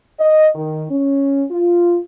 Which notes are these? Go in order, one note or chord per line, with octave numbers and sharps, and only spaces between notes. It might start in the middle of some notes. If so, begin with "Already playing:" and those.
D#5
D#3
C#4
F4